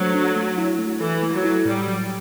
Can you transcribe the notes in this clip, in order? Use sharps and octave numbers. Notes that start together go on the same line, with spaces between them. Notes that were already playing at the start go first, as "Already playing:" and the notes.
Already playing: F#3 A3 D4 A4 C5
D4
A3
E4
A3
E3 A4
A3
F#3
E4
A2 G3
F#3